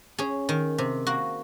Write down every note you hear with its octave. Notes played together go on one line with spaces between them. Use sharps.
C#4 G#4
D#3
C3
A#3 F#4